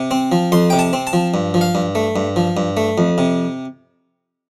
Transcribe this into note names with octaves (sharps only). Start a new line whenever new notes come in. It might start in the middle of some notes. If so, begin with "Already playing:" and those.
Already playing: C3
C4
F3
F2 C6
C3 G5
A5
C4
A5
F3
G2
F3
F5
G2
A3
G2
F3
G2
A3
F2
C3